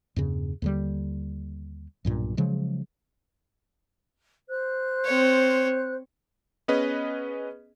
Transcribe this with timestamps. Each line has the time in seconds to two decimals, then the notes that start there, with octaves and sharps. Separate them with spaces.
0.16 E2 G2 C#3
0.62 D#2 D3 G3
2.05 B1 G2 A#2
2.37 C#3 F3 F#3 G#3
4.50 C5 F#6
5.05 C4 C#5
6.68 B3 C#4 G#4 B4 D#5